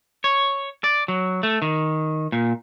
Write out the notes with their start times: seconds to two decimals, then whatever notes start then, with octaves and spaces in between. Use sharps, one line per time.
0.24 C#5
0.84 D5
1.08 F#3
1.43 A3
1.62 D#3
2.32 A#2